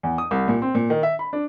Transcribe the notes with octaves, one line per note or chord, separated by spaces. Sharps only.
E2
D#6
C2
A#2
C4
A#2
D#3
E5
B5
D4